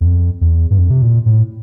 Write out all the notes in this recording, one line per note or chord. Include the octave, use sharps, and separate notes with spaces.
E2
F2
E2
G2
F2
C3
A#2
A2